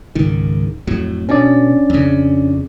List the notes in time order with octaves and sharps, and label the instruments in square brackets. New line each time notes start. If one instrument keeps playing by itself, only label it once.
[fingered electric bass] C#2 G#2 D#3
F2 A2 F#3
[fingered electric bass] B2 [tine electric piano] C#4 D4 D5
[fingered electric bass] F2 C#3